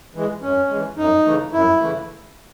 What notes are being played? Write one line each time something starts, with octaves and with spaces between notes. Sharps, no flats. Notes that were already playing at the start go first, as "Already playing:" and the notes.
E3 G#3
F#2 C#4
E3 G#3
F#2 D#4
C#3 E3 A3
F#2 E4
C#3 E3 A3